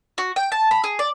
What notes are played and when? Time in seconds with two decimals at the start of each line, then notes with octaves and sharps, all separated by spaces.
0.18 F#4
0.36 G5
0.52 A5
0.71 B5
0.84 G#4
0.99 D5